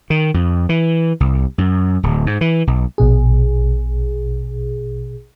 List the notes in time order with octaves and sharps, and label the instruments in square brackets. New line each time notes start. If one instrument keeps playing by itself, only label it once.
[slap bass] D#3
F2
E3
C2
F#2
D1
G#2
E3
B1
[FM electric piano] A#1 B2 G#4